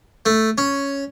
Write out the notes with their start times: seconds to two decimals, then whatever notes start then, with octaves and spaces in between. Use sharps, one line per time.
0.26 A3
0.58 C#4